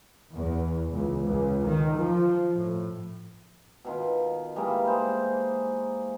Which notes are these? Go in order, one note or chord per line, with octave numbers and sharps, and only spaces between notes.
E2
C#2
C#2
D#3
F3
A2
B2 D#3 F4
E3 G3 G#3 A#3
G#3 C5 D5